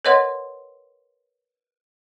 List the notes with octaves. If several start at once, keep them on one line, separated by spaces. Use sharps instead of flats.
A#4 B4 C#5 D#5 F#5 C6